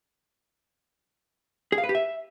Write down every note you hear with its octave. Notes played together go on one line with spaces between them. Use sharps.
G#4
F5
B4
G4
E5